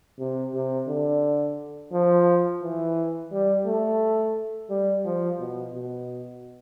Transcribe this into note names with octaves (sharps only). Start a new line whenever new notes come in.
C3
C3
D3
F3
E3
G3
A3
G3
F3
B2
B2